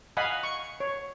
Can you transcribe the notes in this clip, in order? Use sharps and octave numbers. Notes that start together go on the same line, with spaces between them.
D#5 F5 F#5 G#5 B5
C#6
C#5